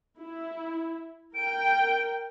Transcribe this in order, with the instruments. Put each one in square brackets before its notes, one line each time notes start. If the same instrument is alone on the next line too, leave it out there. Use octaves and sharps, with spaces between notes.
[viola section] E4
[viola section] A#4 G5 [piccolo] D7